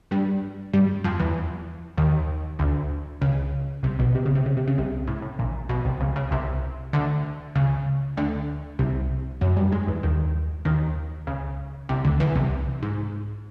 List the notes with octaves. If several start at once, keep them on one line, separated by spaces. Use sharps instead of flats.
G2 G3
G2 G3
F2 F3
E2 E3
D#2 D#3
D2 D3
C#2 C#3
C2 C3
B1 B2
C3
C#3
C3
C#3
C3
C#3
C2 C3
A2
A2
A#1 A#2
B1 B2
C2 C3
C#2 C#3
C#2 C#3
C2 C3
D2 D3
C#2 C#3
D2 D3
C2 C3
F#2 F#3
G2 G3
G#2 G#3
E2 E3
D#2 D#3
D#2 D#3
C#2 C#3
C2 C3
D2 D3
E2 E3
C2 C3
G#2